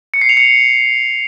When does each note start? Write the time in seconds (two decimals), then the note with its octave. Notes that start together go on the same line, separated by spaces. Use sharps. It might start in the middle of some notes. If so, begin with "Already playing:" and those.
0.14 C#7
0.21 C7
0.29 F7
0.37 C#7